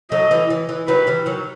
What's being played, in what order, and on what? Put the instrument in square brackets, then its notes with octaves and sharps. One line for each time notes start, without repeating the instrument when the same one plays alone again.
[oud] F#3 A3 [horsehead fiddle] D#5
[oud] E3 G3
E3
E3
[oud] D#3 F#3 [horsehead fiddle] B4
[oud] E3 G3
D#3 F#3